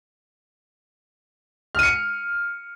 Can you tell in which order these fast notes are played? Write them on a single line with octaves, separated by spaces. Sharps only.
F6 D#7 C#7